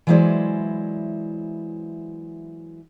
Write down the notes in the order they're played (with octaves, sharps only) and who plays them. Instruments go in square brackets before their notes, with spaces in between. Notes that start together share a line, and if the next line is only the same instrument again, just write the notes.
[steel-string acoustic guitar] E3 F#3 G#3 E4 C5 D5